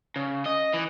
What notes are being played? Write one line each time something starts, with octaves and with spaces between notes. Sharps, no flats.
C#3
D#5
E3